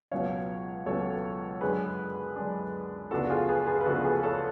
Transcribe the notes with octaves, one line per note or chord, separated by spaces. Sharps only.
C#2 B2 F#3 C#4 C#5 F5
C#2 B2 F#3 C#4 A4 C#5
F#2 D3 G#3 D4 G#4 B4
F#2 D3 G#3 D4
D2 C#3 F3 B3 D4 F#4 A4
F#4
F4 G#4
G#4 B4
G#4 B4
B4
D2 C#3 F3 B3 D4 F#4 A4
G#4 B4
A4 C#5